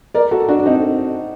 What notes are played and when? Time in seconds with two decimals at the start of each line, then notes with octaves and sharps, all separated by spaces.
0.15 A#4 D5
0.31 F#4 A4
0.48 D4 F#4
0.59 D4
0.66 C4 D#4